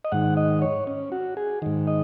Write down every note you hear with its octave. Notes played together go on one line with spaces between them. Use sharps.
D#5
G#2 D#3 F#5
D#5
C#5
C#4
F#4
G#4
G#2 D#3
D#5